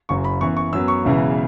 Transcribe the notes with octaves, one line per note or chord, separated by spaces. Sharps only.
F#1 F#2 F#3 C#6
B5
F#2 E3 B3 C#6
C#6
F#2 F#3 B3 E6
C#6
E1 E2 C#3 E3